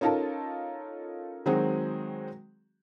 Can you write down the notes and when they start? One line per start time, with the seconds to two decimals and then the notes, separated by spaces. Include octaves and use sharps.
0.01 C#4 D#4 F4 A4 A#4 A5
1.46 D#3 F#3 G#3 C4 F#4 G#4